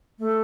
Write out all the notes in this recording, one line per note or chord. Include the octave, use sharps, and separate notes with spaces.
A3